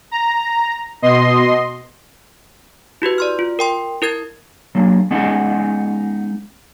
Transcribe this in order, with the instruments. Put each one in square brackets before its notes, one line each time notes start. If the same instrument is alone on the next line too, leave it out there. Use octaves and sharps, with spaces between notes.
[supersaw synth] A#5
B2 D#5 C6
[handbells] E4 F#4 G4 B4
D5 C6 F6
F4
A#4 G5 C6
E4 A#4 G#6 A6
[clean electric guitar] F#3 A#3 D4
G#3 B3 C#4 D#4 D#5 F#5